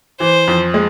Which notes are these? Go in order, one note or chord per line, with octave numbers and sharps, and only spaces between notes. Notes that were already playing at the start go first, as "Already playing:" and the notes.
E3 C5
F2
G#3